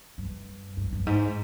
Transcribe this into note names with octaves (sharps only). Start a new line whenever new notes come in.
G2
G2
G2
G#2